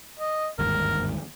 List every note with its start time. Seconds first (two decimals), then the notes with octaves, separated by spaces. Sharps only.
0.20 D#5
0.59 G1 D#2 G#2 A#4